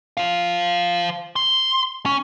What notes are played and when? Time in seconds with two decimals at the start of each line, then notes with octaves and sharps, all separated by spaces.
0.17 C5 F5
1.36 C6
2.06 C#4